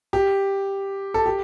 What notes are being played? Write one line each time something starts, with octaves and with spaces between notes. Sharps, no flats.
G4
A4
G4